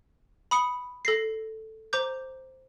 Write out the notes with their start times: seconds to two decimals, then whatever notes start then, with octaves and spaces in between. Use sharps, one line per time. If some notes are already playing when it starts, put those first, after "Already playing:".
0.51 B5 D#6 C#7
1.05 A4 A#6 C7
1.93 C5 A#5 D6 G6